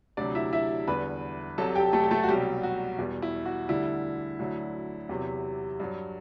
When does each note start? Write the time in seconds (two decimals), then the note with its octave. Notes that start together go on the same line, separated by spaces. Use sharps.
0.17 D2 C3 F#3 D4 D5
0.35 E4 E5
0.53 E4 E5
0.87 E2 D3 G3 B4 B5
1.58 C2 C3 F#3 A4 A5
1.75 G4 G5
1.93 A3 A4
2.04 G4
2.11 A3 A4
2.23 F#4
2.28 C2 B2 F#3 G3 G4
2.63 F#4
2.99 E2 B2 G3
3.22 E4
3.46 F#4
3.69 D2 D3 G3 E4
4.39 D2 D3 F#3
5.09 E2 C3 F#3
5.80 G2 F#3